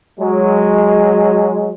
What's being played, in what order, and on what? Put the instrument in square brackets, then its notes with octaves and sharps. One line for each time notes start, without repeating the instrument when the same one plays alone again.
[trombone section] F#3 G#3